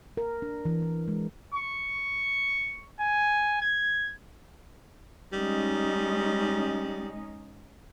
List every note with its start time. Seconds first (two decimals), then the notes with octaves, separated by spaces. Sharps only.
0.17 A#4
0.42 D4
0.65 E3
0.82 E3
1.08 G#3
1.54 C#6
3.00 G#5
3.62 G#6
5.33 G3 G#3 C#4 D#4